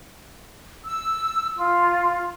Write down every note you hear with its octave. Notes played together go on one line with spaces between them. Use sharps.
E6
F4